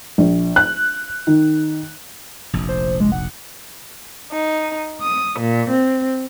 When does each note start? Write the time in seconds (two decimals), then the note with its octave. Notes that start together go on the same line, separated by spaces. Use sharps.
0.18 A#1
0.56 F#6
1.27 D#3
2.53 F1 A#1
2.69 C5
3.00 G#3
3.12 F#5
4.30 D#4
5.01 D#6
5.39 A#2
5.69 C4